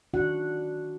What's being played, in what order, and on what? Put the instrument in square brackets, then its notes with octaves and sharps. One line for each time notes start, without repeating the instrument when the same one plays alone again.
[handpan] D#3 D4 F#4 F#5